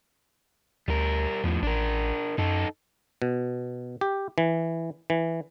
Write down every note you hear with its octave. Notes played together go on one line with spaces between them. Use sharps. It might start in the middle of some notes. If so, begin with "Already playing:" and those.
D2 G3 A#4
E2 A2 F3
A1 D4 A#4
F#2 D#4 A4
B2
G4
E3
E3